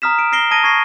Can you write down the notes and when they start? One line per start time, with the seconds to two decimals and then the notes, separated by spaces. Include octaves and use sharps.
0.02 A#5 D#6 F6 B6 E7
0.19 D7
0.32 F6 A#6 C7 D7 G7
0.51 A5 D#6 G#6 A#6 D#7 G7
0.64 C#6 G#6 A#6 C7